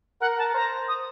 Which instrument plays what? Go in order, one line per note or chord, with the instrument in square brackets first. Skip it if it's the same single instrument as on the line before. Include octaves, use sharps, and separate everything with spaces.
[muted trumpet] A#4 [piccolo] F#5
[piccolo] A5
[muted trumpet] C5 [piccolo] A#5
[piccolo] D#6